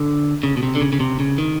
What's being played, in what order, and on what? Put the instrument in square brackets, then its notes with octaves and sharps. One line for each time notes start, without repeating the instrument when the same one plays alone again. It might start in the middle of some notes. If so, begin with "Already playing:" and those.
Already playing: [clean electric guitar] D3
C#3
B2
C3
D3
C#3
C#3
C3
C#3
D#3